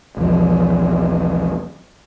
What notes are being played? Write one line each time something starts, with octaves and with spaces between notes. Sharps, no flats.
B1 E2 F3